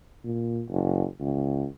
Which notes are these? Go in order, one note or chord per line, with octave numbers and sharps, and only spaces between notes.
A#2
F#1
C#2